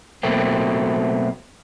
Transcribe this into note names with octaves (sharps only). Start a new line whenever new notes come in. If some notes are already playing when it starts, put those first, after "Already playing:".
B2 F#3 A3 A#3 C4